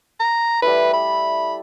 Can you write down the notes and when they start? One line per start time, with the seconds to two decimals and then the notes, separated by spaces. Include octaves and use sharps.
0.20 A#5
0.62 G3 A3 E4 B4
0.93 B5